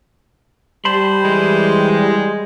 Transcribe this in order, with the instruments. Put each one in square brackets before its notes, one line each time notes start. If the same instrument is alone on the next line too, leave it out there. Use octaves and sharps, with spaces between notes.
[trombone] G3 [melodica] C5 [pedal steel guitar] A5 B5 C6
[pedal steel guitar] E3 [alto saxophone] G#3